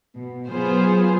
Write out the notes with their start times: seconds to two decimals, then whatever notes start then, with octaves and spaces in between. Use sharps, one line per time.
0.16 B2
0.50 F#3 B3 F4 G#4 C5